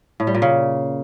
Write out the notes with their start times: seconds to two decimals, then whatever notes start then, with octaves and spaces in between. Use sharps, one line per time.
0.20 A2
0.27 G3
0.35 A#2
0.42 C#3